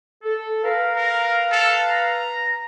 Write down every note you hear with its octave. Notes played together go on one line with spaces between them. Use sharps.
A4
A#4 B4 F5
A#4
A4
A#5